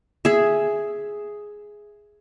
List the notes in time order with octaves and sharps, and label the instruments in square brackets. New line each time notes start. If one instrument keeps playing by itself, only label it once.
[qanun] G#4 E5